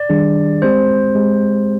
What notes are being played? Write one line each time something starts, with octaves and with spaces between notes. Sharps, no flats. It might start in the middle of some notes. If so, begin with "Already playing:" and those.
Already playing: D5
D#3 G3 D4 G#4
G#3 C4 G4 C5
G#3 C4 G4